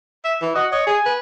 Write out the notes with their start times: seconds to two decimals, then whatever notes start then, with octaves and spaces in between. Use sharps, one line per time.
0.24 E5
0.41 E3
0.55 F#4 D#5
0.72 C#5 D#5
0.87 G#4 G#5
1.05 B4